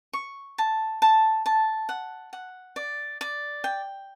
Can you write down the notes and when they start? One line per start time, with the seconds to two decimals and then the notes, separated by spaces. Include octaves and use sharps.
0.13 C#6
0.58 A5
1.02 A5
1.46 A5
1.89 F#5
2.33 F#5
2.76 D5
3.21 D5
3.64 G5